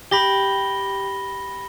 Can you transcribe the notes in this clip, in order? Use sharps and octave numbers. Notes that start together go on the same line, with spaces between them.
G4 B5 A#6 G7